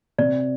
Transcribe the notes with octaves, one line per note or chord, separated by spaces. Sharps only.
C3 D5